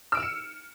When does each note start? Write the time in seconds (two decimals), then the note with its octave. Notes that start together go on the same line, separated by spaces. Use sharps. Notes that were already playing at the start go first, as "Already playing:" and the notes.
0.12 E6
0.15 D7
0.17 F6
0.20 E7
0.23 C#7